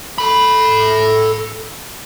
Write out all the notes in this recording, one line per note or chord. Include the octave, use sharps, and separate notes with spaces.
A4 B5